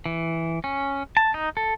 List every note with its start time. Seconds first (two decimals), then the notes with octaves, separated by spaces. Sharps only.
0.06 E3
0.64 C#4
1.17 A5
1.34 D#4
1.57 A4